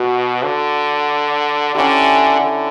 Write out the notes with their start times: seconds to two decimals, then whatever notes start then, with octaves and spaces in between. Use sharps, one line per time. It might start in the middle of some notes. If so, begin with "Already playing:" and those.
Already playing: B2 F#4
0.44 D3
1.75 D3 C#4 E4 G4
2.40 D3